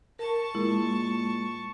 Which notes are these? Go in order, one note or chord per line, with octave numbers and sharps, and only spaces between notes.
A#4 A5 C#6
A#2 G#3 E4